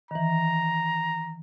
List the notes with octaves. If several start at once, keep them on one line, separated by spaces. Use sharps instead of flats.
D#3 E3 A#5